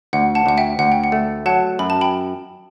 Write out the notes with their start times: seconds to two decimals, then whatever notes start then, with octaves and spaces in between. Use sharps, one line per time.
0.13 D2 F#5
0.35 F#5 A5
0.46 D2 F#5
0.57 E5 G5
0.79 D2 F#5
0.92 G5
1.04 F#5
1.12 A3
1.46 F#3 F#5 A5
1.79 F#2 B5
1.90 A5
2.01 G5 B5